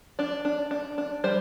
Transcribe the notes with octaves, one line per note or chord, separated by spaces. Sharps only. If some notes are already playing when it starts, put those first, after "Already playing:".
D4 D5
D4
D4
D4
G3 C5